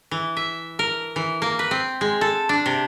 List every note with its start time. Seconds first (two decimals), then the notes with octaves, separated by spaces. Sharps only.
0.11 E3
0.37 E5
0.79 A#4
1.16 E3
1.42 A#3
1.59 B4
1.71 C4
2.01 G#3
2.21 A4
2.49 D4
2.66 C3